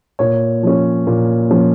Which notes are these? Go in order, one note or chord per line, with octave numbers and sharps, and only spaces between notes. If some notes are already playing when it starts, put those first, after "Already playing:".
A#2 C#5
F3 C#4
A#2
F3 C#4